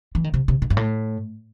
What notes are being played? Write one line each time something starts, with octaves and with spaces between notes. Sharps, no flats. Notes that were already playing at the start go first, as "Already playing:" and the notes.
E3
D#3
C3
C3
B2
G2
A2